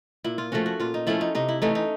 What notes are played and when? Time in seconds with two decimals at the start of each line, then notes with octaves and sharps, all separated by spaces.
0.24 A#2 E4
0.38 F4
0.52 F3 A3 C#4 F#4
0.66 F#4
0.80 A#2 F4
0.94 D#4
1.07 F3 A3 C#4 E4
1.21 D#4
1.35 C3 D#4
1.49 E4
1.62 E3 A3 C#4 D#4
1.75 D#4